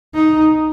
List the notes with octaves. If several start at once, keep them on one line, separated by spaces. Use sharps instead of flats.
D#4